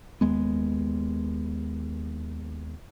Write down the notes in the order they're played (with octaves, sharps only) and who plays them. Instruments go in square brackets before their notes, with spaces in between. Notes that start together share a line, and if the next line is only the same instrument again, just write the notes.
[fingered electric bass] D#2 G#3 B3